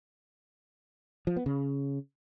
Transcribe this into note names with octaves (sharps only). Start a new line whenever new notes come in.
F3
B3
C#3